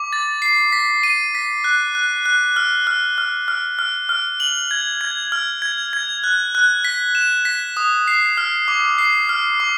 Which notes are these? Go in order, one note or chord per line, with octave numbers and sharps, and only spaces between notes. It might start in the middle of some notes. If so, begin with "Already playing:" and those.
Already playing: D6
A6
C7
B6
D#7
B6
F#6
F#6
F#6
F6
F6
F6
F6
F6
F6
F#7
G#6
G#6
F6
G#6
G#6
F#6
F#6
B6
E7
B6
D#6
C7
F6
D6
C7
F6
D6